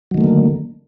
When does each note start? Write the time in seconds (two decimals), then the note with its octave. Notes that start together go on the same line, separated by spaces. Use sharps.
0.11 F#3
0.14 D#3
0.18 A3
0.21 A#3
0.24 D3